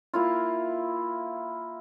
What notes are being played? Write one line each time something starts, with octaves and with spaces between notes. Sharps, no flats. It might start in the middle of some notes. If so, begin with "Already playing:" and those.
A#3 E4 F4